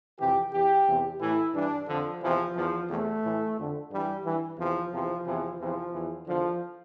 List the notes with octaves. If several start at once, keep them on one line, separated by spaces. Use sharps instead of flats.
F2 C3 E3 G4
E2 E3 G4
E2 C3 E3
A2 E3 E4
G2 E3 D4
F2 D3 F3
E2 C3 E3 F3
E2 E3 F3
E2 C3 E3 A3
A2 E3
F2 D3
G2 E3 G3
G2 E3
E2 C3 E3 F3
E2 C3 E3 F3
E2 C3 E3 F3
E2 C3 E3 F3
E2 E3
E2 D3 F3